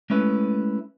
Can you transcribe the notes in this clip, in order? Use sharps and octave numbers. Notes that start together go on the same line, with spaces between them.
G#3 A3 C#4 E4 B4